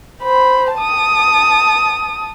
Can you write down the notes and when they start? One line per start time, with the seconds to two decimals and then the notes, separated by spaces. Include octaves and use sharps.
0.23 C5 B5
0.75 A5 D#6